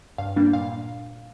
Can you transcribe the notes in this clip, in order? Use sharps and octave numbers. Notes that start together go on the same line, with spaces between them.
G2 F5
G3 A#3 D4
A#2 F5